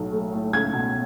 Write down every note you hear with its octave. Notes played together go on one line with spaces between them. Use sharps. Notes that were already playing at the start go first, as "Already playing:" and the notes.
Already playing: B1 A2 F#3
A3
A2
C#2 G#6
B2